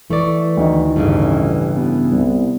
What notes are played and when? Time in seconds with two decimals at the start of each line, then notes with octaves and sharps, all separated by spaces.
0.10 E3 A3 D5 C#6
0.57 D2 D#3 D#4
0.96 A1 G2 C#3 E3
1.76 B3
2.11 C2